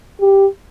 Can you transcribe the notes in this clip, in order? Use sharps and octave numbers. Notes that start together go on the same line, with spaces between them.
G4